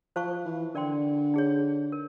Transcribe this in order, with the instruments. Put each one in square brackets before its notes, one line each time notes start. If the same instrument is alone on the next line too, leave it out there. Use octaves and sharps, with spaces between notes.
[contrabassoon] F3 [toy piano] C5 F5 A5 C#6
[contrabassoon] E3
[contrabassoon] D3 [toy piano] A#4 D5 G5 C6
[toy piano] D#4 G#4 C#5
A#4